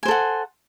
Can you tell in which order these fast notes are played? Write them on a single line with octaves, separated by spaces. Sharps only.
G#5 C5 A4 F#5